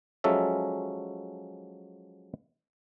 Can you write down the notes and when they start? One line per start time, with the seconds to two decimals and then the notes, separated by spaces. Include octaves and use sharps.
0.24 F3 F#3 G#3 C#4 A4 E5